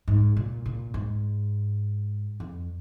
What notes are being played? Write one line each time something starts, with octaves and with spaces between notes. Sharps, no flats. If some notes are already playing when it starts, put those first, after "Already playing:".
G#2
A#2
A#2
G#2
F2